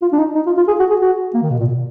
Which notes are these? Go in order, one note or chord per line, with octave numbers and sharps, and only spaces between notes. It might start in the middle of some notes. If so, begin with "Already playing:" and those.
F4
D4
D#4
D#4
F4
F4
G#4
F#4
G#4
F#4
A#3
D#3
B2
A#2
B2